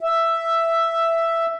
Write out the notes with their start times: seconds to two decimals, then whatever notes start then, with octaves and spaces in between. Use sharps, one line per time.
0.01 E5